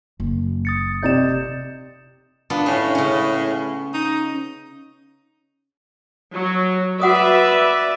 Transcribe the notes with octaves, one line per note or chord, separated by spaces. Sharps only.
F#1
D#6 A6 C#7
C3 D5 D#5 G6 A6 E7
B3 D4 F4
A2 C#4
C#3 C#4
D#4
F#3
F#4 B4 D5 E5 F#5 D#6